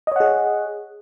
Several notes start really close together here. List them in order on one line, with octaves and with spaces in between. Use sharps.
D#5 C#5 F#5 G#4